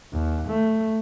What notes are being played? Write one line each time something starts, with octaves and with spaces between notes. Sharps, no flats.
D#2
A3